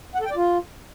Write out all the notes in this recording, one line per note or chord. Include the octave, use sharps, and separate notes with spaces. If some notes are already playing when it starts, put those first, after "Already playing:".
F#5
A4
G5
D5
F4